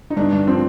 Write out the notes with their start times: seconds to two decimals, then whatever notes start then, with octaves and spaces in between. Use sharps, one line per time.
0.10 D#4
0.16 G2 D4
0.33 G2
0.47 F3 C4